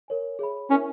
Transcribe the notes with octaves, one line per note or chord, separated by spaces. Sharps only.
A#4 C#5 G#5
G#4 C#5 E5 B5
C#4 E4 A#4 C#5 E5